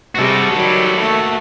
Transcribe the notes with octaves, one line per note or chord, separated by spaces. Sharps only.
C3 G3 G#3 F#4 A4
D#3 F#3 G3
A3 A#3